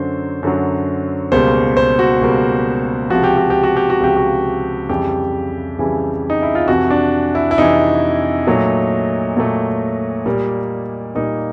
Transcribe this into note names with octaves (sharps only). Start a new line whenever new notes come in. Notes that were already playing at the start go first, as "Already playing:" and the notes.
Already playing: F#2 D3 F#3 C5
F#2 D3 F#3
C#2 B2 G3 A#3 C5
C5
F#4
C#2 B2 G3 A#3
C#2 C3 F3 F#4
G4
F#4
G4
F#4
G4
F#4
C#2 C3 F3 G4
F#4
F2 C#3 E3 G3 G4
F2 C#3 E3 G3
D#4
E4
F4
F2 C3 E3 F#4
D4
E4
E4
F2 C3 E3 D#4
A#2 F#3 A3
A#2 F#3 A3
A#2 G3 A#3
A#2 G3 A#3 D#4